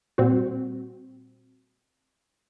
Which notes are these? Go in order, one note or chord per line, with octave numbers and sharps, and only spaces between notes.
A#2 G3 C4 F#4